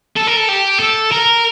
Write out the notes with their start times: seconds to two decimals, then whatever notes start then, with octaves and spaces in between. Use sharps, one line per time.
0.16 A4
0.27 A#4
0.36 A4
0.48 G4
0.79 A4
1.12 A#4